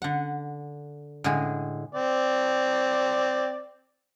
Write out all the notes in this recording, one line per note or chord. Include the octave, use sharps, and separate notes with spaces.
D3 F#5
A2 D3 G#3 G#4
C4 D5